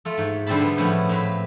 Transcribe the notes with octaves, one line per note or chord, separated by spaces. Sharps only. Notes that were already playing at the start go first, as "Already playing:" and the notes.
A3 F4 A4
G#2
D3 G3 C4 E5 A5 B5
B3
A2 F3 C#4 E4 F#5
A2 C4 B4 F5